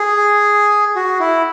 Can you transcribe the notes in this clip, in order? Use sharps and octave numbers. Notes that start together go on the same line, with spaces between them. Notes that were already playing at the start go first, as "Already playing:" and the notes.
Already playing: G#4
F#4
E4